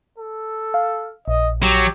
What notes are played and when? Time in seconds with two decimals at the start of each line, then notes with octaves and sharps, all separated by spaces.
0.18 A4
0.74 F5
1.28 A#1 D#5
1.63 F#3 G4